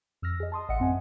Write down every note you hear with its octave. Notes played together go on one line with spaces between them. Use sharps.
F2 E6 F6 A#6
G#4 D#5
A5 C6 D#6
A1 D#5 E5 F#5 C#7
F#2 C4 F#5 G#5